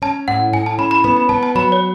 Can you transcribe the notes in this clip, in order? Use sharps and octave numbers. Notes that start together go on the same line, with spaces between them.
C#4 A5
A2 F#5
A2 G#5
A5
C#4 B5
B5
B3 B5
B5
B3 A5
A5
F#3 B5
C#5